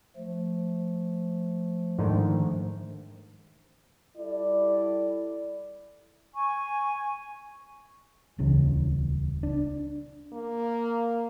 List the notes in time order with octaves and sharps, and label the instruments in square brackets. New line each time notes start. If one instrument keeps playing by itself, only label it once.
[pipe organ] F3 A3
[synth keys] G#2 D3 D#3
[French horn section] G3 E4 A4 D5
[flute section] G#5 C#6
[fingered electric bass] D#1 C#2 C#3 E3
D4
[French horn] A#3